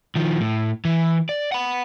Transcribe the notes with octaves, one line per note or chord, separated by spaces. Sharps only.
D#3 F3
A2
E3
D5
F#5 B5